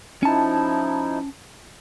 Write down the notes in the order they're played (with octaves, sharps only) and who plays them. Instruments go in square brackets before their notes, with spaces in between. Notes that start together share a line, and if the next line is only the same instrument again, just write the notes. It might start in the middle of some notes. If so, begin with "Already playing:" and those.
[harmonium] F3 D#4 E4 [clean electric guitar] C#4 A5